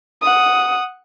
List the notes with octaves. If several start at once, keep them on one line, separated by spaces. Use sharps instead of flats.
F#5 D#6